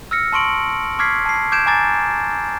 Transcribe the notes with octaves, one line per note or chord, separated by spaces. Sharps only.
E6 F6 A#6 C#7
A5 C6 C#6 D7 F#7
C#6 D6 F6 G#6 B6 C7
A5 C7
D6 G6 G#6 D7 E7
G#5 A#5 D6 A6